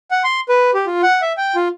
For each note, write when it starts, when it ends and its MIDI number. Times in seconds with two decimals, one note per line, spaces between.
0.11 0.23 78
0.24 0.40 84
0.49 0.71 71
0.74 0.85 67
0.86 1.02 65
1.03 1.21 78
1.22 1.33 76
1.37 1.55 79
1.55 1.68 65